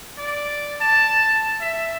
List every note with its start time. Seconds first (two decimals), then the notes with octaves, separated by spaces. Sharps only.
0.18 D5
0.81 A5
1.61 E5